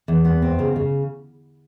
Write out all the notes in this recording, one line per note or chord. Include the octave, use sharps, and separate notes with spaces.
E2
B3
C4
C#3
C#3